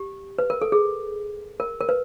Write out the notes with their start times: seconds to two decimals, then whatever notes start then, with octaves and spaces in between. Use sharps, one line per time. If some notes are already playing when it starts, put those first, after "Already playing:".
Already playing: G4
0.38 B4
0.50 A#4
0.62 A4
0.72 G#4
1.60 A#4
1.81 A#4
1.89 B4